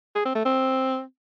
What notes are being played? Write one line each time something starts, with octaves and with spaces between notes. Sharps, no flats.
G#4
C4
A3
C4